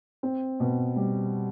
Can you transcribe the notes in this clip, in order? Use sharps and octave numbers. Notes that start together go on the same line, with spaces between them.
C4
B2
G3